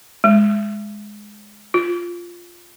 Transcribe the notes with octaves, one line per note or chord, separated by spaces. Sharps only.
G#3
F4